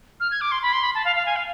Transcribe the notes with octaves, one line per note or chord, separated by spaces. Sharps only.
F6
G#6
D6
C6
B5
C6
B5
A5
F5
F5
G#5
F5